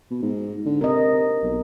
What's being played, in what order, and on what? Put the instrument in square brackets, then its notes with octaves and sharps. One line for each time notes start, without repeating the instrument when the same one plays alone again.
[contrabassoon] B2
G#2
D3
[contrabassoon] C3 [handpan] A#4 D#5
[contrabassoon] B1